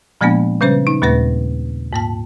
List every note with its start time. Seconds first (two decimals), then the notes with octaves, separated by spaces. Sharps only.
0.21 A#2 F3 G#3 A#3 B3 D4
0.61 C#3 G3 C#4 B4 C5
0.87 D#4
1.02 D#2 A#2 A3 B4 A#6
1.93 G#2 A#3 A5